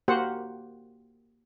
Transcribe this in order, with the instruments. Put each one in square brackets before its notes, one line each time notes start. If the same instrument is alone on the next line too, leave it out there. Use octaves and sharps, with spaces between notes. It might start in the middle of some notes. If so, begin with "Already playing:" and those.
[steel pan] A#3 F#4 G4 C5 F#5